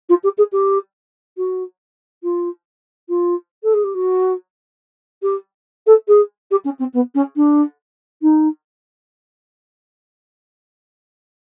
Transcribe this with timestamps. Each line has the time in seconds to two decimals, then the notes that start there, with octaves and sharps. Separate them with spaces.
0.09 F4
0.23 G4
0.38 G#4
0.52 G4
1.37 F#4
2.23 F4
3.09 F4
3.63 A4
3.73 G#4
3.84 G4
3.94 F#4
5.22 G4
5.86 A4
6.08 G#4
6.51 G4
6.64 C#4
6.79 C4
6.93 B3
7.14 C#4
7.36 D4
8.22 D#4